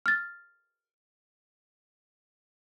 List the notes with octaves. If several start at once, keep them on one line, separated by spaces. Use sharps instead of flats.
F6 A6